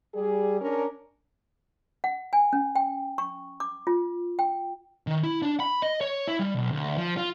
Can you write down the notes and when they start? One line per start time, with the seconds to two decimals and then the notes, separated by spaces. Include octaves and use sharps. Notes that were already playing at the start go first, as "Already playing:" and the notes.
0.14 G3 G#4
0.61 C#4 D4 A#4
2.04 F#5
2.33 G#5
2.53 C#4
2.75 G5
3.18 C#6
3.60 D6
3.87 F4
4.39 G5
5.07 D#3
5.23 E4
5.42 D4
5.60 B5
5.82 D#5
6.01 C#5
6.28 E4
6.39 G3
6.56 B1
6.72 D2
6.97 F3
7.17 F4